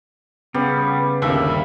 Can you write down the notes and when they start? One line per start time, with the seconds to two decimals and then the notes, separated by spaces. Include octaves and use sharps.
0.54 C#3 G3 B3
1.22 G1 D#2 C#3 G3 E5 F5